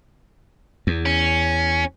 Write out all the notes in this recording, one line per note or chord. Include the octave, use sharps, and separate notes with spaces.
E2
C#4